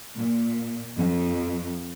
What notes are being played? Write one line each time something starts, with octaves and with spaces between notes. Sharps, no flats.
A#2
F2